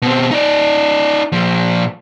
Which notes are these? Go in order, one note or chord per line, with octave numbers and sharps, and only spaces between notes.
B2 C4
D#4 D5
A#2 F3